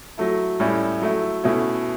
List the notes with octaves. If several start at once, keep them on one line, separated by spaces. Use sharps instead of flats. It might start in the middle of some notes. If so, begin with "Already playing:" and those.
F#3 A3 E4
A2 G3 C#4 E4
F#3 A3 E4
B2 A3 C#4 E4